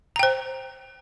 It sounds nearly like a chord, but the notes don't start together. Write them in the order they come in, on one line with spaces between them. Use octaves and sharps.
A#5 G5 C5